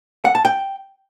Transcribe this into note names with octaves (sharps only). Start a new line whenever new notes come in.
F#5
A5
G5